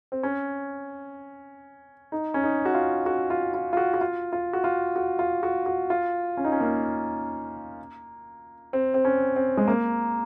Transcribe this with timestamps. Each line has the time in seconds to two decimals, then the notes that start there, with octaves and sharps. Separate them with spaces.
0.12 C4
0.23 C#4
2.12 D#4
2.34 C#4
2.43 D#4
2.65 F#4
2.74 F4
3.06 F#4
3.30 F4
3.54 F4
3.73 F4
3.77 F#4
3.94 F#4
4.01 F4
4.33 F4
4.53 F#4
4.64 F4
4.96 F#4
5.19 F4
5.43 F#4
5.66 F#4
5.90 F4
6.37 C#4
6.44 D#4
6.52 C#4
6.60 A#3
8.73 C4
8.94 C4
9.05 C#4
9.36 C4
9.57 G#3
9.68 A#3